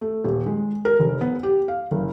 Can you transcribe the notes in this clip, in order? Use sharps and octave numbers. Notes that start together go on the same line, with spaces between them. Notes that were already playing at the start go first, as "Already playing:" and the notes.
A3
D#1
G#3
A#4
F1
B3
G4
F5
F#1